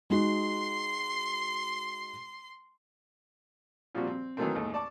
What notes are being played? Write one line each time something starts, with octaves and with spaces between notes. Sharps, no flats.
G#3 D#4 F#4 C6 C7
A#2 F3 G3 C4 F#4
C4
D#3 E3 F#3 A3 A#3 C4
D#2 A2 G#3 A3 D#4
D5 A5 C#6 D6